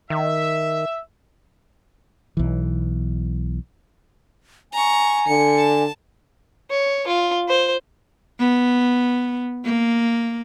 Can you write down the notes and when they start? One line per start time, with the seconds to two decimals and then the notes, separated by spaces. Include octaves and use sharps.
0.10 D#3 E5
2.37 B1 E3
4.73 G#5 A#5 C#6
5.28 D3 C#7
5.58 A5
6.70 C#5
7.07 F4
7.49 C5
8.40 B3
9.65 A#3